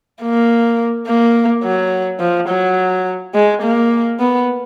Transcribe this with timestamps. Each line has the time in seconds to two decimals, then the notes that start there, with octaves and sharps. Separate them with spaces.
0.22 A#3
1.07 A#3
1.64 F#3
2.20 F3
2.49 F#3
3.34 G#3
3.63 A#3
4.19 B3